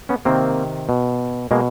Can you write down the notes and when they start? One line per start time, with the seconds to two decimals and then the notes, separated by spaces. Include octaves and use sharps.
0.09 B3 C#4
0.25 C3 D#3 A#3 C4
0.89 B2
1.51 B2 G#3 A#3